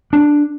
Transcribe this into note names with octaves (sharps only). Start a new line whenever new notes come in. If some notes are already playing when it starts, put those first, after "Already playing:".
D4